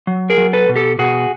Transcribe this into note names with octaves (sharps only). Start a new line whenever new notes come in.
F#3
G#4 A#4
F#3
A4 B4
B2
G4 A4
B2 F#4 G#4